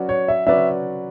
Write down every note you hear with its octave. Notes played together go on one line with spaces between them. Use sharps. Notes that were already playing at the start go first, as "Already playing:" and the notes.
Already playing: F#3 C#4 F#4 B4 D5
C#5
E5
F#3 C#4 F#4 B4 D5 E5